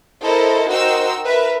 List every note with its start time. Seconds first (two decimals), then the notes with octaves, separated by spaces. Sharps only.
0.21 E4 A4 A#4 C5 D#5
0.70 D#4 F#4 A#4 C5 G5 E6
1.25 A#4 B4 E5